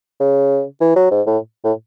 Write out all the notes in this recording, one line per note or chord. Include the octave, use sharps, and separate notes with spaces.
C#3
E3
F#3
G#2
A2
A2